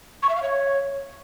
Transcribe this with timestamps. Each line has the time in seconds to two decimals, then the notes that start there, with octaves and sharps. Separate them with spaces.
0.23 C#6
0.29 E5
0.36 F5
0.43 C#5